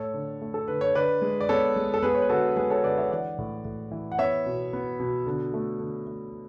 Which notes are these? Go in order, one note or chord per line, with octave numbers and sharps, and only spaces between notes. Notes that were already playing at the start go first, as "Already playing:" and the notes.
Already playing: A2 A3 A4 C#5
D3
A3
A4
D3 B4
C#5
D3 B4 D5
G#3
D5
B3 A4 C#5
G#3
A4
B3 G#4 B4
C#5
B4
D3 F#4 A4
G#3 G#4 B4
A4 C#5
D3 B4 D5
C#5 E5
E3 D5 F#5
A2
A2
E3
F#5
B3 C#5 E5
B2
B3
B2
D3
A3
D3
A3